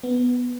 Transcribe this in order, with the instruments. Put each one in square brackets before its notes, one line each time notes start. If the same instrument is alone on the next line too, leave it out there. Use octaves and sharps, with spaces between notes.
[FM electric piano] B3